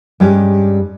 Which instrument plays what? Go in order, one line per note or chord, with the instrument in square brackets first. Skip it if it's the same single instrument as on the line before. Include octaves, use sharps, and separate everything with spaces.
[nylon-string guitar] G2 G#3 C#4 G4